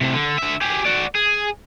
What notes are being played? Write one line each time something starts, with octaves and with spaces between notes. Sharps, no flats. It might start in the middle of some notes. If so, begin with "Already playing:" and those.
A2 C3
D3
D3 E5
G4 G#4
F#4 D5
G#4